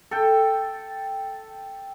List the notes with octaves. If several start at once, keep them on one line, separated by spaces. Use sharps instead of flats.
A4 G5